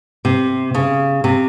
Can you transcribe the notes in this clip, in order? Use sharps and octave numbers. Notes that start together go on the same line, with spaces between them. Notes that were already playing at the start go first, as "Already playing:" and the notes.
C3
C#3
C3